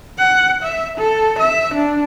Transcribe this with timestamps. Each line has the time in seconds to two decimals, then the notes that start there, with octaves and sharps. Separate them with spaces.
0.19 F#5
0.63 E5
0.98 A4
1.39 E5
1.74 D4